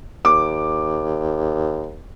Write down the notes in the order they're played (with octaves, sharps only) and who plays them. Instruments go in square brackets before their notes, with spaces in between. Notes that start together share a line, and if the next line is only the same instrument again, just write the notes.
[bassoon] D#2 [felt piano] D6